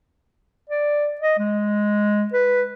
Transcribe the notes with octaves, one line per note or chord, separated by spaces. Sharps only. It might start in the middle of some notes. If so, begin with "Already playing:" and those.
D5
D#5
G#3
B4